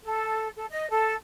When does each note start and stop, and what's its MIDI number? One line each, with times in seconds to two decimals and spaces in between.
0.04 0.48 69
0.56 0.65 69
0.70 0.89 75
0.89 1.15 69